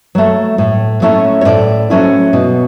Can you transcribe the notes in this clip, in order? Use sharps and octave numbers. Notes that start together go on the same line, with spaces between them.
F#3 A3
A2
F#3 A3 C#4 E4
C#5
A2 C5 D5
F#3 A3 C#4 E4
B2